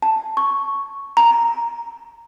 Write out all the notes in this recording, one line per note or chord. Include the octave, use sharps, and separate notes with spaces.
A5
C#6
A#5